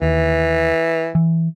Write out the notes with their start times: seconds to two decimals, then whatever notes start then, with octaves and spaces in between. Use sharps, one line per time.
0.02 D#2 E3
1.15 E3